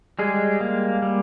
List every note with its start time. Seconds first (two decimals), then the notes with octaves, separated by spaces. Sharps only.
0.19 G3 G#3 G#4
0.61 A#3
1.02 G3